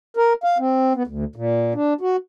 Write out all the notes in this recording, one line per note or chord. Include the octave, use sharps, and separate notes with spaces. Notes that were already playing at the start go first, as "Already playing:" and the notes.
A#4
F5
C4
B3
D2
A#2
D4
F#4